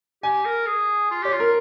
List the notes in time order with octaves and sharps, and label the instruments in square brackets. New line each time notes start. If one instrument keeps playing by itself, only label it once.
[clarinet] G4 [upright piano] G#5
[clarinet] A#4
G#4
F4
[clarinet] G4 [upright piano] C#5
[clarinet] F4
[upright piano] A#4